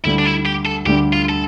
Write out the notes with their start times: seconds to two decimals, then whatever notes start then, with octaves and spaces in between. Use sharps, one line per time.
0.04 D2 D3 G3 E4
0.19 D4
0.25 E4
0.46 G4
0.66 A4
0.85 D2 D3 G3 G4
1.13 F4
1.29 A4